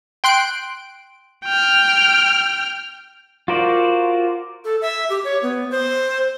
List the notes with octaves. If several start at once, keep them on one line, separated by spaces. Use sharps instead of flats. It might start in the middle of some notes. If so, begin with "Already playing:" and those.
G5 C6 F#6 D7
G5 F6
F4 F#4 A#4 C5 D5
A4
E5
G4
C#5
B3
C5